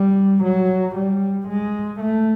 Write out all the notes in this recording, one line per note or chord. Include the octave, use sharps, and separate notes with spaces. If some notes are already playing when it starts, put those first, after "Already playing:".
Already playing: G3
F#3
G3
G#3
A3